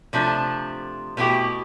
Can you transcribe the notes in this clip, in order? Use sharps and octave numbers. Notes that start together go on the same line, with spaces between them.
C3 F3 A3 D4
B2 A3 E4 G4